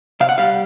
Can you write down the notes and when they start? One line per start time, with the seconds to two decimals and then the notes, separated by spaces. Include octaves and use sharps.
0.20 C3 F5
0.29 F#5
0.38 G3 F5